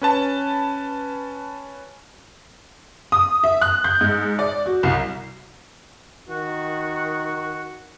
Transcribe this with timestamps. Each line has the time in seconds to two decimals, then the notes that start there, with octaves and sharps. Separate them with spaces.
0.01 C#4 B4 A5
3.12 D#6
3.44 E5
3.61 F#6
3.84 G6
4.01 G#2
4.39 D5
4.66 F#4
4.83 C2
6.29 D#3 F#4